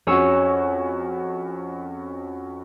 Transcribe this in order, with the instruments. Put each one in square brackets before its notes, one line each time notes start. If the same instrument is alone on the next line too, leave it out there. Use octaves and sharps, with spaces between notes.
[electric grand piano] F2 C#4 F#4 [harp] G#4 C#5 E6